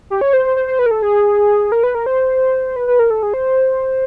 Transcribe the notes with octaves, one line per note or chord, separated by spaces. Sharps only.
G4
C#5
C5
C5
C5
C5
B4
A#4
A4
G#4
A#4
B4
A#4
C5
B4
B4
A#4
A4
G#4
C5